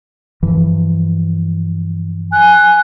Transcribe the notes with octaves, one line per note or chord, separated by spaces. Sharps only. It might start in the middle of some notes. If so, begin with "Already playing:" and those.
G2 E3 F3
G#5 F#6